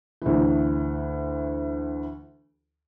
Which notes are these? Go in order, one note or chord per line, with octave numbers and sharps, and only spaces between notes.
D2 E3